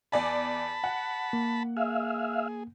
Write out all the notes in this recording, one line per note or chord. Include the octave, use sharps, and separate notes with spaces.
E2 D5 G#5 A5 B5
F#5
A#3
G#4 E5 F5